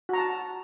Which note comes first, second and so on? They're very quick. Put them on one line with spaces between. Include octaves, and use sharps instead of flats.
F#4 A#5 A5